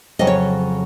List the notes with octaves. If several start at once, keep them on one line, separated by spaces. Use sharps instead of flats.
F2 C#3 F#3 D#5
C#5